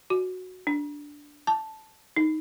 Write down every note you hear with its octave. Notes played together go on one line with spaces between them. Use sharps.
F#4
D4
A5
D#4